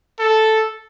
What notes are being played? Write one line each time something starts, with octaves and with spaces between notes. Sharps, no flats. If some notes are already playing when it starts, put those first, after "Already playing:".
A4